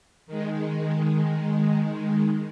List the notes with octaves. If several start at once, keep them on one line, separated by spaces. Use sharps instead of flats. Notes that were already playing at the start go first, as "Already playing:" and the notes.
D#3 G#3